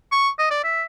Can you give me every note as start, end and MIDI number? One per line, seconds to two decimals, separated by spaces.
0.12 0.29 85
0.39 0.47 75
0.51 0.61 74
0.64 0.83 76